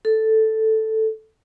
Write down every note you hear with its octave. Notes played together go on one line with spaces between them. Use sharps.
A4